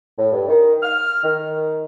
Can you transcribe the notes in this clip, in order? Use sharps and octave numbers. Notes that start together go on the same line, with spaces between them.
A2
G2
D#3
F6
D#3